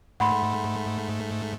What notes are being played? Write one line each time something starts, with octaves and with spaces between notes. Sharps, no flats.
G#2 A3 F#5 B5 C6